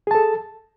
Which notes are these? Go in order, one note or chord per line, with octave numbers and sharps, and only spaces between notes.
G#4 A4 A5